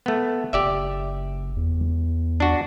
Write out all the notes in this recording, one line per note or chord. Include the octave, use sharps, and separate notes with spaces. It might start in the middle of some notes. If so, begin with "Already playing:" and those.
A3 B3
F#1 G4 D5 E5
E2
D4 F#4